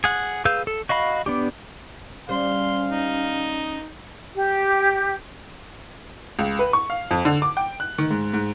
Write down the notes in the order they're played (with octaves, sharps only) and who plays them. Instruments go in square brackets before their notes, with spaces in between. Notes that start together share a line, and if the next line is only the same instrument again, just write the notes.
[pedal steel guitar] G#4 F#5
G#4 B4 F5 E6 G6
A4
F#4 D#5 F5 B5
B3 D4 G4
[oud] G3 C5 [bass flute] C#4 [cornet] F5 [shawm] C6
[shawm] D#4
[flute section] G4
[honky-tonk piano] C#2
B4
C#6
F5
F2
D3
D6
G5
F#6
D#3
G#2
G#2